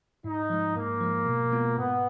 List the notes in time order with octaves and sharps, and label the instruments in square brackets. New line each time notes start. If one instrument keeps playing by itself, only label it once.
[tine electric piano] G#2 [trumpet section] D#4
[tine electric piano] F3 G#3
[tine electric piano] G#2 [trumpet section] A#3
[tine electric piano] F3 G#3
B2
G#3 B3 F4
[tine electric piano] G#2 [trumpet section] B3